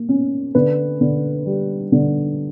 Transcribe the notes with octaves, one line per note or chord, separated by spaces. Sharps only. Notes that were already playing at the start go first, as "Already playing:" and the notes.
Already playing: A#3
C#4
D3 B4
D3
G3
D3